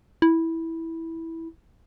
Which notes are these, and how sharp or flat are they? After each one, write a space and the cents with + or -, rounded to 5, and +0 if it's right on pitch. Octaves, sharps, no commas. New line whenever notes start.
E4 -10